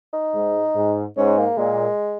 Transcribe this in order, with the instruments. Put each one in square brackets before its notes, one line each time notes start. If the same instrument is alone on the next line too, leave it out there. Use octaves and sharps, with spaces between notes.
[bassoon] D#4
[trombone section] G#2
G#2
[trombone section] G#2 [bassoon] C#4
[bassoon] A#3
[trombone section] A#2 [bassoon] G#3